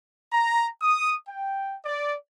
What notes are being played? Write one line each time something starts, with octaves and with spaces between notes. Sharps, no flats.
A#5
D#6
G5
D5